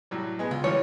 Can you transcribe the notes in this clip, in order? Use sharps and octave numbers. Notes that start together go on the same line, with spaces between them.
A2 F#3 G3
G#3 B3 G#4
C#2 F4
E3 F3 G3 C#5